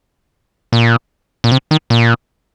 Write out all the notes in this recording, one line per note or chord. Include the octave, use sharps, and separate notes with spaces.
A#2
A#2
C3
D#3
A#2